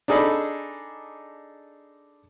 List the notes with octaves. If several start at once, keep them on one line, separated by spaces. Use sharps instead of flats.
D4 D#4 G#4 A4 D#5 B5